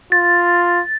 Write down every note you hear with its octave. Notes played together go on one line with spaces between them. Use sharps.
F4 A6